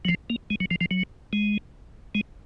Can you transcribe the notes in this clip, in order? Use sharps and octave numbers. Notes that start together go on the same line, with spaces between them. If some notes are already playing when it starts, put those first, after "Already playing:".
F#3
F3
A#3
G#3
F#3
F3
F3
F#3
G#3
G#3